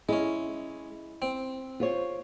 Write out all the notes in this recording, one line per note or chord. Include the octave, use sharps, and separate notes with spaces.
G#3 C#4 E4
C4
F4 C5 C#5